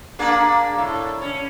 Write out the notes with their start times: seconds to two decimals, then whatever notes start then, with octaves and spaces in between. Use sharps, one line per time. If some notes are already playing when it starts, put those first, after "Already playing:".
0.19 A#3 D4 G#4
0.78 A2
1.22 C#4